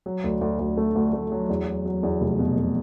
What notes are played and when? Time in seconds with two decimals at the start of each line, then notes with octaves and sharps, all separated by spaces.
0.06 F#3
0.24 D2
0.41 D2
0.59 D2
0.77 A3
0.95 D2
1.13 A3
1.32 F#3
1.49 E2
1.67 F#3
1.85 F#3
2.03 E2
2.21 F1
2.39 B2
2.56 F1